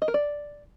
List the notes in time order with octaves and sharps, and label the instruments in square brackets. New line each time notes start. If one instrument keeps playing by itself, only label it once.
[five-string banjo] D#5
A#4
D5